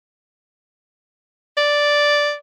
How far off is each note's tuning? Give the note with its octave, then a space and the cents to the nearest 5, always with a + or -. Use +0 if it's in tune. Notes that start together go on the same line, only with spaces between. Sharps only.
D5 -5